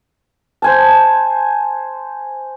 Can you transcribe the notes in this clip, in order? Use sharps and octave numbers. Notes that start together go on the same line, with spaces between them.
C5 G#5 A5